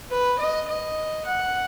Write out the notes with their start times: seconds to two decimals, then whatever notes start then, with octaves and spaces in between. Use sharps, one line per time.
0.11 B4
0.39 D#5
0.68 D#5
1.25 F#5